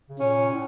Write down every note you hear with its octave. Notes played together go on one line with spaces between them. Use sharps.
C#3
A#2 C#4
A2